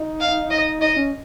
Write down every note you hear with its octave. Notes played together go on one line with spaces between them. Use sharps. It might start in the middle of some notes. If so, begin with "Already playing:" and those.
Already playing: D#4
F5
D#4 D#5
D#4 D#5
C#4